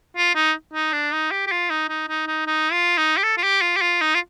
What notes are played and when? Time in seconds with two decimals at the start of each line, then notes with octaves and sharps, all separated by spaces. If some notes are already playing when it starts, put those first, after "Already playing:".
0.17 F4
0.35 D#4
0.73 D#4
0.93 D4
1.13 D#4
1.31 G4
1.46 G4
1.51 F4
1.70 D#4
1.89 D#4
2.08 D#4
2.27 D#4
2.46 D#4
2.72 F4
2.97 D#4
3.17 G4
3.23 A4
3.37 F4
3.43 G4
3.61 F4
3.76 G4
3.81 F4
4.01 D#4
4.14 F4